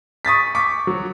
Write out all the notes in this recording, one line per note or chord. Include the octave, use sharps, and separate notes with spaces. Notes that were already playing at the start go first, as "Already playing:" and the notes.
C#6 D#6 A6 B6
C#6 D6 B6
F#3